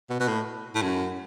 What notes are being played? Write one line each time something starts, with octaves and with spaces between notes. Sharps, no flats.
B2
B2
A2
A2
F#2